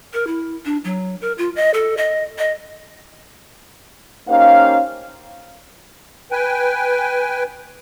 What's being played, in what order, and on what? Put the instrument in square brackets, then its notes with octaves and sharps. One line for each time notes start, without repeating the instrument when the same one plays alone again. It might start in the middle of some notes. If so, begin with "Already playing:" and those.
[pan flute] A#4
E4
D4
F#3
A#4
F4
D#5
A4
D#5
D#5
[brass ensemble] A#3 C#4 D#4 G4 C5 F5
[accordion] B4 G5 G#5